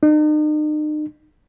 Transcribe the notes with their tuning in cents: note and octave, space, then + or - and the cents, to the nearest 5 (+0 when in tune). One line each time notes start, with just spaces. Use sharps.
D#4 -40